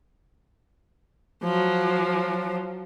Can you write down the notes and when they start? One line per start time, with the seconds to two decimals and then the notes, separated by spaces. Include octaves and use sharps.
1.43 F3 F#3